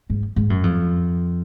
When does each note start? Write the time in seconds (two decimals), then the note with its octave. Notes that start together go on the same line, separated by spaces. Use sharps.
0.10 G#2
0.36 G#2
0.50 F#2
0.63 F2